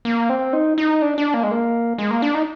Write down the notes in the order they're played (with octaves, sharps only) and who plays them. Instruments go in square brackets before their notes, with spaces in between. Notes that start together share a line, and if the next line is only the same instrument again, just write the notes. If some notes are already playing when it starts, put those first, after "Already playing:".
[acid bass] A#3
C4
D#4
D#4
D4
D4
A#3
G#3
A#3
G#3
A#3
D4
D#4